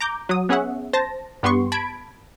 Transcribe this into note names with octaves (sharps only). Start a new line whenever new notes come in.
A#5 D6 G6
F#3 D#6
B3 C#4 G#4 C#5 E5 F#5
C5 A5 A#6
G2 B3 G4 C6 C#6
A5 B5 G#6 B6 D7